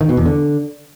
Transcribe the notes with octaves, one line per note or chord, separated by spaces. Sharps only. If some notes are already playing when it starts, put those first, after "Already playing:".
D#3
B2
E2
D3